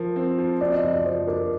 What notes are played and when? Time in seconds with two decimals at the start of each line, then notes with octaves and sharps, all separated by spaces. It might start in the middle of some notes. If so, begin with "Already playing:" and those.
Already playing: F3 A#4
0.16 C4
0.38 F3
0.60 C4 D5
0.72 D#5
0.82 F3 D#5
0.94 D5
1.05 F3 C5
1.27 D4 A#4